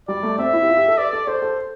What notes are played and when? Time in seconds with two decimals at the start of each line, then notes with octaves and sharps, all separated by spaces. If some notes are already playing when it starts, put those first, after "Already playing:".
0.08 G3 D5
0.23 A3
0.38 C4 E5
0.53 E4
0.62 G4
0.68 F4
0.77 G4
0.88 A4
0.98 B4 D5
1.13 A4
1.27 A4 C5
1.42 A4